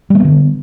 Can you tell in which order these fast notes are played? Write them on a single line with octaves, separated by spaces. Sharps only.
G3 A#3 B3 D3